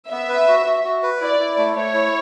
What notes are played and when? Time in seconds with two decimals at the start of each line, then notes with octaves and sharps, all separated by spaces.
0.10 B3 E5
0.29 B4
0.48 F#4
0.66 F#4
0.84 F#4
1.03 B4
1.21 E4 D5
1.39 E4
1.58 A3
1.76 A3 C#5
1.94 E4